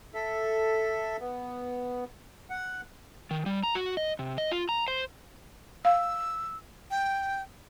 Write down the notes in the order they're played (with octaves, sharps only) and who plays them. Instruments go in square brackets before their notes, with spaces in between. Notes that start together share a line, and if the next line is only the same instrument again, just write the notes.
[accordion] A4 E5
B3
F#5
[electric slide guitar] D#3
G3
A#5
F#4
D#5
C3
D#5
F4
A#5
C5
[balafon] F5 [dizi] E6
[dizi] G5